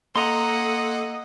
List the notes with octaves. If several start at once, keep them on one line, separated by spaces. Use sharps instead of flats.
A#3 A4 D#5 F#5 A#5 C6